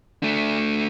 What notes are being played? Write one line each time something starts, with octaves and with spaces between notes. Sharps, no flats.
A3 D4